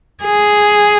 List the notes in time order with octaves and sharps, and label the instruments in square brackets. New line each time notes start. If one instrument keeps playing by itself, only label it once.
[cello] G#4